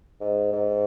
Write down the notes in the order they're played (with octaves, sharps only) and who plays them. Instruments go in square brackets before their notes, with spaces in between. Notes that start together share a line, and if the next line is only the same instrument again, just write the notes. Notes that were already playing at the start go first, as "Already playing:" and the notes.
[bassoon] G#2
G#2